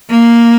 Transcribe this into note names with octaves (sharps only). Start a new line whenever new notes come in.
A#3